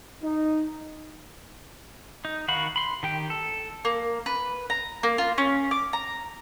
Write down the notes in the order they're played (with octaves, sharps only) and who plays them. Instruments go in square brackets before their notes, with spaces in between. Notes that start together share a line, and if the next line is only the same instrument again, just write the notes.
[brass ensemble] D#4
[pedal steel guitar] D#4
D#3 F#4 F5 F#5 B5
B5 C6
D#3 G4 G5
A4
[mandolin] A#3
B4
A#5
A#3
F4
C#4
D6
A#5